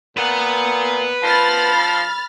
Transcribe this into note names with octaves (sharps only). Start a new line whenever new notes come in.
A#2 B4 F#5
F3 B5 F6 A6